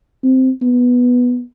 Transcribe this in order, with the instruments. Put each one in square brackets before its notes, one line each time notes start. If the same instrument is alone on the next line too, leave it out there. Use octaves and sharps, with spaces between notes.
[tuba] C4
B3